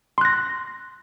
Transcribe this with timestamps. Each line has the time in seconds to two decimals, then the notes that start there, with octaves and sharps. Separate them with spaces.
0.18 C6
0.21 F#6
0.25 A#6